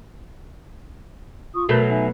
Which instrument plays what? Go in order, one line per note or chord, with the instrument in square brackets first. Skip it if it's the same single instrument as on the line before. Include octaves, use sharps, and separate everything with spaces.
[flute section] F4 C#6 D#6
[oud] B2 F#3 A3 [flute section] A4 A#4
[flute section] D#4 E5 G#5